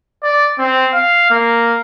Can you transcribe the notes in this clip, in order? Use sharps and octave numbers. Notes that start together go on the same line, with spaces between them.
D5
C4
F5
A#3